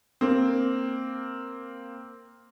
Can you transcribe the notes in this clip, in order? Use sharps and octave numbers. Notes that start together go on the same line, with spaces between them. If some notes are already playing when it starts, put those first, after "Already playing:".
A#3 C4